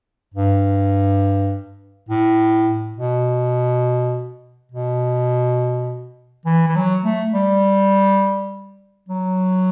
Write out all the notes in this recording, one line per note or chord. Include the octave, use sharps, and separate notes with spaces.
G2
A2
B2
B2
E3
E3
F#3
A3
G3
F#3